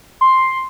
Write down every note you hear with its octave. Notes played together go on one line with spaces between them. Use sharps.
C6